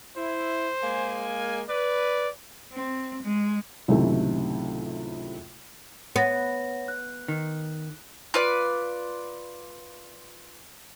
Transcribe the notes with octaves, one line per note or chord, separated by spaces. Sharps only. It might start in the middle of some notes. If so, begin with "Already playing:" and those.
E4 C5
G#3 A#3 G#5
B4 D5
C4
G#3
C#2 F#2 A2 C3 D#3 A3
B3 C#5 F#5 A#6
F#6
D#3
F4 B4 D5